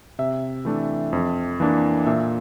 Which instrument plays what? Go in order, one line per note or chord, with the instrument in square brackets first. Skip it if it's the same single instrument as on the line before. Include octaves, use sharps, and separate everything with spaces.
[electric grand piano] C3 E5
E3 A3 D4
F2
E3 A#3 D4
A#2 E5